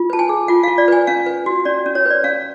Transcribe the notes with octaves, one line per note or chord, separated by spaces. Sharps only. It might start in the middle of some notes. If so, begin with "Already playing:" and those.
Already playing: F4
B4 A5
G#5
G#4
F4 F#5
F5
F4
D5
B4 G#5
C#4 F5
B4
F#4
C#4 D5
C#4
C#5
B4 D5
C#4 F5